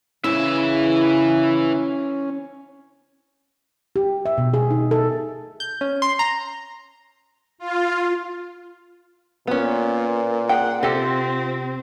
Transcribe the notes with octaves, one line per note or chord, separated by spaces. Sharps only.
C#3 E3 C#4 E4 E5
G4
E5
B2
G#4
D#4
A4
G6
C#4
C6
A#5
F4
A#2 B3 C#4
G#4 F#5 G5
C3 C4 F4 G4 A4 A#6